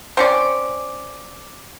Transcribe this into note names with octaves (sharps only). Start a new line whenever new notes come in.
C4 C#4 D5